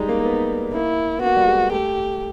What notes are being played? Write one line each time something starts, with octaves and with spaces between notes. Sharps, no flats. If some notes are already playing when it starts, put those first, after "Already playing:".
Already playing: G3 G#3 D#4
A#3
A#3
B3
A#3 E4
B3
A#3 F#4
G3
G#3
A3 G4